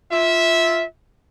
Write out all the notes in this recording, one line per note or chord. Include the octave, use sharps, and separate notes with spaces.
F4 E5